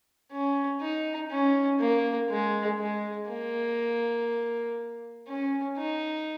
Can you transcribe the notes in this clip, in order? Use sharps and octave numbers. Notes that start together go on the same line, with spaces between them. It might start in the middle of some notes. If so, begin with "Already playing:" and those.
C#4
D#4
C#4
A#3
G#3
G#3
A#3
C#4
D#4